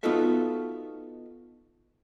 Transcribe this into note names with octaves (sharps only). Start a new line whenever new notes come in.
B3 D#4 F4 F#4 A4 E5